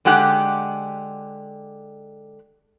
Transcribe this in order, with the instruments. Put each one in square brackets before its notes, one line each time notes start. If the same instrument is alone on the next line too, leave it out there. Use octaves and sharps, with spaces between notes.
[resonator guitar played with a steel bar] D3 G#3 G4 F#5